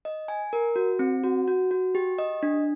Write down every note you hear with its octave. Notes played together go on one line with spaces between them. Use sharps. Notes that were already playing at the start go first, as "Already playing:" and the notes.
D#5
G#5
A#4
F#4
C4
F#4
F#4
F#4
G4
D#5
D4